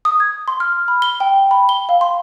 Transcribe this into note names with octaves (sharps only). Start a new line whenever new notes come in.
D#6
G#6
C6
F6
B5
G7
G5
B5
G7
F5
C6